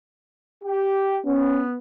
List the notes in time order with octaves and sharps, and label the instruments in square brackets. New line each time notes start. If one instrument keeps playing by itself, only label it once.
[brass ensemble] G4
[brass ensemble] B3 [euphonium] C#4